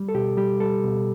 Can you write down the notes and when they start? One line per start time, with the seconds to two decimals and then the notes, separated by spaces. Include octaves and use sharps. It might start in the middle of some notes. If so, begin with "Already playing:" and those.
Already playing: G3
0.09 A4
0.14 B2 G4
0.37 G3 G4
0.60 G3 A4
0.84 B2